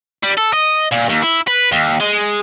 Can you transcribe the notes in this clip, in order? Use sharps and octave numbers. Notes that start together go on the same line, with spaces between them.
G3
A4
D#5
A#2
D#2
E4
B4
D#2
G#3